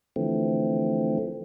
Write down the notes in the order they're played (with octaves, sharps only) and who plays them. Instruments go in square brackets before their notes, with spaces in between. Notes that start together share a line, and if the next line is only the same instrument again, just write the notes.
[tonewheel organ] D3 E3 F3 A3 C4